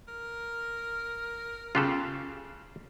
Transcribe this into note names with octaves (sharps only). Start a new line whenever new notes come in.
A#4
C#3 F4 G4 A4 F#6